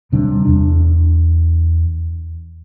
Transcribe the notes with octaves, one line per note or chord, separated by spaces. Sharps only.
D#1 C3 G3 D4
E2 D4